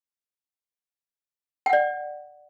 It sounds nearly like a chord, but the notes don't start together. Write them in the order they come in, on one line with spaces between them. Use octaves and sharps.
G5 F#5 D5